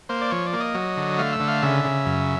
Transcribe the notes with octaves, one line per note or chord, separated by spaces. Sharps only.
A#3 C5
D5
F3 C#5
D5
A#3
D#5
F#3
D3
A3 F5
E5
D3
F5
C#3 E5
C#3
F#2